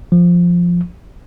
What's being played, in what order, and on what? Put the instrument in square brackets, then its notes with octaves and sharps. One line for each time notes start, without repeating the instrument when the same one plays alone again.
[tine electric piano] F3